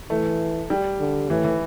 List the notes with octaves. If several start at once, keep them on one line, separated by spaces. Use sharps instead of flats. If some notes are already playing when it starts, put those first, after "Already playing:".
E3 A3
G3
D3
A2 E3
E3